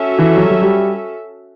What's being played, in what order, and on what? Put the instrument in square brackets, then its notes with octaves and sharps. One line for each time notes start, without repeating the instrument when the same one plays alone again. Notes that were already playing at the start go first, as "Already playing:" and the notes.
Already playing: [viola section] C#4 F#4 A4 E5
[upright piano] E3
F#3
G3
F#3
G3